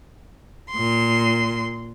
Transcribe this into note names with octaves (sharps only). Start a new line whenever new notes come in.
A#2 C6